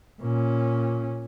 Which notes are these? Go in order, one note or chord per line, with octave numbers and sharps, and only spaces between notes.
A#2 C#4